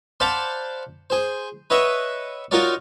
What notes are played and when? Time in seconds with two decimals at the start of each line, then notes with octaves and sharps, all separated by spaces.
0.20 C5 D5 F5 F#5 A5 B5
1.10 G#4 C5
1.70 B4 C#5 D#5 E5 F#5 C#6
2.51 D#4 F4 F#4 A#4 C#5 D5